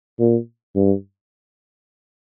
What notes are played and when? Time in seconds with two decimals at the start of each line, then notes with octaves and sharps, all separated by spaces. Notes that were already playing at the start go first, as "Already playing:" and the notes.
0.19 A#2
0.75 G2